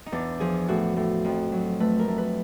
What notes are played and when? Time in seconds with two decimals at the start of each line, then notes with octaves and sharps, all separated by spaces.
0.06 D#4
0.12 E2 D4
0.40 F3 G#4
0.68 A2 F#4
0.97 A2
1.25 F2
1.52 F#3
1.80 A3 B4
1.99 A#4
2.08 A3
2.18 B4